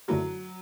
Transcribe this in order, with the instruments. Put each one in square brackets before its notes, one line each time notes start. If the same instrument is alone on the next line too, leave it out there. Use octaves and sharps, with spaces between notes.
[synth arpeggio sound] F#2 D3 A3 E4 [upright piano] F#3